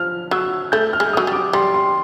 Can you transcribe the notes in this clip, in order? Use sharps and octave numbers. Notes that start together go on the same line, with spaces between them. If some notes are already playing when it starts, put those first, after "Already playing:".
Already playing: F3 F6
F#3 E6
A3 G6
F6
G#3
F#3 D#6
G3
D6
G3 C6
C6